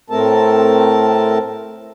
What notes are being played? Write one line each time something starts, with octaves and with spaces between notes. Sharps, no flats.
A2 A3 C4 A4 A#4 A5